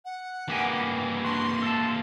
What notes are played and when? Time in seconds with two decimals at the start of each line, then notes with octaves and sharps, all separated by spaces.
0.05 F#5
0.48 G2 E3 A#3 G4 G#5
1.24 D4 F#4 C6
1.62 A4 A5